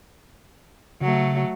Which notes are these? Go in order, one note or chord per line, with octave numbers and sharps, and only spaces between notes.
C#3 F#3 A3